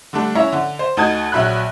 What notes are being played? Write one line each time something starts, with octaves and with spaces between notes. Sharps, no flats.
D3 G3 A3 D4
C#4 E4 C#5 E5 A#5
D3
C5
D2 D#4 F#4 A5 D#6 G#6
A#1 F#3 E5 B5 F#6